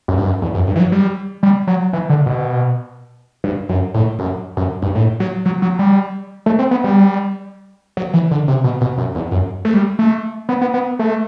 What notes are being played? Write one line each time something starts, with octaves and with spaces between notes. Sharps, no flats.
F#2
G2
F#2
E2
F#2
G2
E3
F#3
G3
G3
F#3
E3
D3
B2
G2
F#2
A2
F#2
F#2
G2
A2
F#3
F#3
F#3
G3
A3
C4
B3
G3
F#3
E3
D3
C3
B2
B2
F#2
E2
F#2
A3
G3
A3
B3
B3
B3
A3